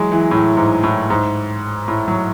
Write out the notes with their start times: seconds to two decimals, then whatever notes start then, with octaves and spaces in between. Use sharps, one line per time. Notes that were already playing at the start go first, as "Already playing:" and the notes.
Already playing: E3 F#3 G#3
0.12 E3
0.31 A2
0.57 G#2
0.83 A2
1.10 G#2
1.88 A2
2.08 F#3